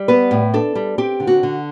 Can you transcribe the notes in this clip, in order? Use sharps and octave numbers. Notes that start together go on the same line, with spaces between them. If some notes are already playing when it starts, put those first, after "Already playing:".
Already playing: G3
B3 B4
A2
D4 A4
G3
C4 G4
D3
F#4
D3